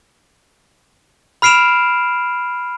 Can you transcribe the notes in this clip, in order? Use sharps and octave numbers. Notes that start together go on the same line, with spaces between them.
B5 F6 C7 D7 E7 F7